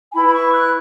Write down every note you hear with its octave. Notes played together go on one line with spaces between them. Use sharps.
G#5
E4 B4 B5
B5
C#6
F#6